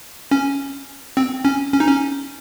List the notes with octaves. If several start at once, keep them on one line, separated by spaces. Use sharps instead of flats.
C#4
C4
C#4
C#4
D#4
C#4